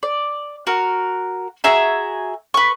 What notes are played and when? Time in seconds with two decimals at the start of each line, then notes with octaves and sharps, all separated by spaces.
0.03 D5
0.67 F#4 A#4
1.64 F#4 G#4 E5 A#5
2.54 B4 C#6